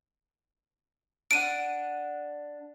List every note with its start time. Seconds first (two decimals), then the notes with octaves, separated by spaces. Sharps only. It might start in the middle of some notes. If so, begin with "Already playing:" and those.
1.31 D4 F#5 D7 D#7